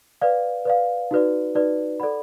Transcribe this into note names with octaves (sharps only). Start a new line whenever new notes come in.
B4 D5 F5
B4 D5 F5
D#4 F#4 B4 D5
D#4 F#4 B4 D5
A4 D5 F#5 B5